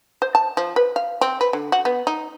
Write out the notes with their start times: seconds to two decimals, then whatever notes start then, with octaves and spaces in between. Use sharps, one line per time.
0.22 C5
0.35 A5
0.57 F3
0.76 B4
0.96 F5
1.21 C4
1.41 B4
1.53 D3
1.72 F#4
1.85 B3
2.07 D#4